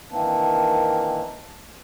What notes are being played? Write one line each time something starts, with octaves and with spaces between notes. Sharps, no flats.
D#3 E3 A#3 C4 D4